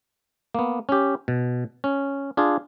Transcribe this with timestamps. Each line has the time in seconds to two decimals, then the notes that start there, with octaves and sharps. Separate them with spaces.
0.55 A#3 B3
0.89 C#4 G4
1.28 B2
1.84 C#4
2.37 D4 F4 G#4